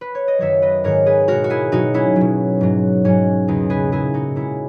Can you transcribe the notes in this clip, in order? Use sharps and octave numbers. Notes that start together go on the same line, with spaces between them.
B4
C#5
D#5
F#2 D#3 F#3 C#5 E5
B4 D#5
G#2 D#3 G#3 A#4 C#5
G#4 B4
B2 G#3 F#4 A#4
F#4
E4 G#4
B2 F#3 D#4 F#4
C#4 E4
F#3
B2
G#2 F#3
G#2 F#3 C#4
E2 C#3 E3 D#4
G#4 B4
A#2 G#3 E4 G#4
D#4 F#4
A#2 G#3 C#4 E4